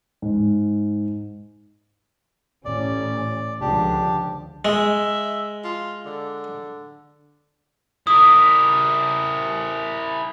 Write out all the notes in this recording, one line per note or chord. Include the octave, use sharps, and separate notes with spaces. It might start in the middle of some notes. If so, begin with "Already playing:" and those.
G#2
A1 C#4 D5
C#2 D3 F3 D4 G4
G#3 E5
F4
D3
E4 A#4 D#6